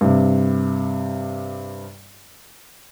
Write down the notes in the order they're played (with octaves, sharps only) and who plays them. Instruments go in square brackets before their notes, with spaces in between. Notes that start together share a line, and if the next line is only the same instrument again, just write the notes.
[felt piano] G2 C3